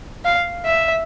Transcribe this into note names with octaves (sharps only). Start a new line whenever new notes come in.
F5
E5